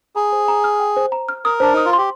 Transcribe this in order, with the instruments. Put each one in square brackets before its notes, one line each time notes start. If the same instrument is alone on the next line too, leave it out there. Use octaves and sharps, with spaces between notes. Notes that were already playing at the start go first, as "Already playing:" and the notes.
[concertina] G#4 [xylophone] A#5
[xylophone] C5
A#5
F6
G5
C5
A#5
F6
[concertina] A#4 [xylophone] D#6
[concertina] D4 [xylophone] C5
[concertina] D#4 [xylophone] D#6
[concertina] F4
[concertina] G4 [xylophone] C6